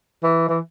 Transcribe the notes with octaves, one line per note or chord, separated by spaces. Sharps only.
E3
E3